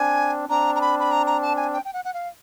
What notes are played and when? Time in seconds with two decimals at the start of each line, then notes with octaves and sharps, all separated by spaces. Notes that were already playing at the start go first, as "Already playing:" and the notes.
Already playing: C4 D4 G#5
0.49 C4 D4 A#5
0.75 A#5
0.81 B5
0.99 B5
1.11 A#5
1.27 A#5
1.42 A5
1.57 G#5
1.72 G5
1.85 G5
1.93 F#5
2.05 F#5
2.14 F5